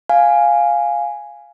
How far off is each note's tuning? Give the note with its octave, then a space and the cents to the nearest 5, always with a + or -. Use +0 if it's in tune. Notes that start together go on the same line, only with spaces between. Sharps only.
F5 +0 G#5 +0